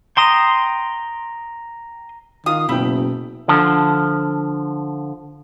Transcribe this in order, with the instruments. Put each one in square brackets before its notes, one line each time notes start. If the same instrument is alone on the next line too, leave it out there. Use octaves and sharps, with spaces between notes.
[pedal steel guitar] G5 C6 D#6 [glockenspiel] A#5 A#6 F7
[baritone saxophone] D#3 [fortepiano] F4 F5 [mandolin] D#6
[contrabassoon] F#1 [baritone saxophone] B2 [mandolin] E4 [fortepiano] G5 B5
[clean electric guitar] D3 F3